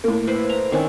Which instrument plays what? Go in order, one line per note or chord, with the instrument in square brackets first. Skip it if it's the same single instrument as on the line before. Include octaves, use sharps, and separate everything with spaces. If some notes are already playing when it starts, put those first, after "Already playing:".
[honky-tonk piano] A2 A#3
[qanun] E4 B4 C5
A#5
D#3 C4 C#4